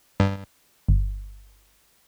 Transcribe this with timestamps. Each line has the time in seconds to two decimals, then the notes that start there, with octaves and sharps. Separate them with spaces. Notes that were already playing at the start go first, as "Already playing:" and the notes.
0.20 G2
0.88 G1